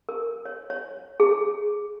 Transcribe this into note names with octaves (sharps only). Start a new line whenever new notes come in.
A#4
C#5
C#5
G#4